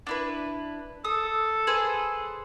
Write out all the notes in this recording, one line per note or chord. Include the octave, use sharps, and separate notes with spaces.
D4 E4 B4
A4 D#6
G#4 B4 C5